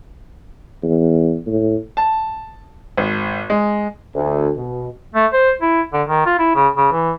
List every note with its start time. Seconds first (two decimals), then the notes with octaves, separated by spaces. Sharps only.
0.83 E2
1.47 A2
1.97 A5
2.97 G#1
3.50 G#3
4.15 D2
4.57 B2
5.15 A3
5.33 C5
5.62 E4
5.93 D3
6.08 D#3
6.26 F4
6.39 E4
6.56 C#3
6.77 C#3
6.92 E3